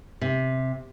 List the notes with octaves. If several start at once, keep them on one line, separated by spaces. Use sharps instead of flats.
C3